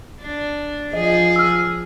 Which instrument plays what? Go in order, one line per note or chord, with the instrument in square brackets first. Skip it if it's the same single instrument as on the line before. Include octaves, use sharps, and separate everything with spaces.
[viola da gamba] D4
[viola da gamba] F3 G#4 [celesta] D#5
[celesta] E6 F6